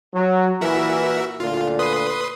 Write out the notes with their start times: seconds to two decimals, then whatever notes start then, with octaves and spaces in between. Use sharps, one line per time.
0.14 F#3
0.61 A#2 E3 F#4 A#4 E5
1.40 D2 A#2 D3 F4
1.79 B4 C6 D#6